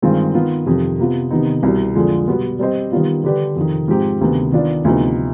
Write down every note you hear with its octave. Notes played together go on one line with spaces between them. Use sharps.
G2 D#3 G#3 C4 F4
D#3 B3 F4
F2 C3 D#3 G3
C3 F3 B3 F4
C3 D#3 B3 D#4
C2 B2 G3
F2 D3 F3 G#3
B2 G3 B3
G3 C4 G4 C5 D#5
D#3 G3 B3 F4
D3 G3 D4 G4 B4
F2 C3 D#3
G#2 F3 C4 G4
D2 C3 D#3 B3
D#3 B3 D4 F4
D2 C3 F3 B3 D#4